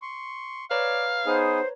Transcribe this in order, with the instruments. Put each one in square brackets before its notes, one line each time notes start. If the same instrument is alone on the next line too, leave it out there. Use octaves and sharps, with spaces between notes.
[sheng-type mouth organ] C6 C#6
[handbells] B4 C#5 A#5 [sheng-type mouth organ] D5 [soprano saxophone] F5
[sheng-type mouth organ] B3 D#4 G#4 [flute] C5